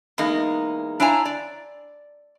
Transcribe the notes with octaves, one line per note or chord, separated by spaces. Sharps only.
E2 G#3 A#3 D#4
D4 E4 C#5 F5 G#5 A#5
D5